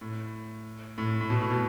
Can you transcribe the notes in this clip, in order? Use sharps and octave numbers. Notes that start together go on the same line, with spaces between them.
A2
A2
A2
B2
A2
B2